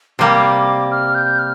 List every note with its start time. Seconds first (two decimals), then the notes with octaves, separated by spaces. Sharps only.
0.19 C3 G3 A#3 D6
0.91 F6
1.15 G6
1.39 F6